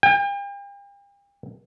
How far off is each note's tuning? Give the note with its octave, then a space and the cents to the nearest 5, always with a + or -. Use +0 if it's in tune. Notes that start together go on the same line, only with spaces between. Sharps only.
G5 +40